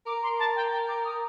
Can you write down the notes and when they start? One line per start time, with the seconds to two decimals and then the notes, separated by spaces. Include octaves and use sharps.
0.06 A#4 D6
0.23 C6
0.39 A5
0.56 G5
0.72 G5
0.88 D6
1.05 D#6